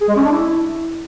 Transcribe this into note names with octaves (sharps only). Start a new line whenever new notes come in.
G#4
G#3
C#4
D4
E4